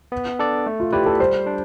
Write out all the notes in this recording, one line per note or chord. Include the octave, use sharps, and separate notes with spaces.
B3
D4 A4 D5
A3
F4
E4 G4 B4 D5
A4
G3 C5
D4